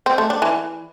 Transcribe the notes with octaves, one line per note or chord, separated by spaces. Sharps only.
C4
A3
D4
E3